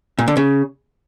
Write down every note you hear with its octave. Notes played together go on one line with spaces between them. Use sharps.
A#2
D3
C#3